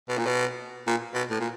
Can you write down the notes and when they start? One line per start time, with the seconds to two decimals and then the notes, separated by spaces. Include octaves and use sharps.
0.09 B2
0.18 A#2
0.27 B2
0.87 A#2
1.15 B2
1.30 A2
1.40 A#2